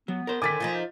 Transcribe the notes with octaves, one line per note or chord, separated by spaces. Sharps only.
F#3 B3
A#4 C5
D3 D#3 G#5 D6 A6 B6
F3 D#4 F4